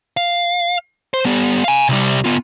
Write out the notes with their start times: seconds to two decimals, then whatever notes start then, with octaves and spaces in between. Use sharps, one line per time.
0.17 F5
1.14 C5
1.25 G3 B3
1.64 F5 G#5
1.89 C2 G3
2.24 B3 F4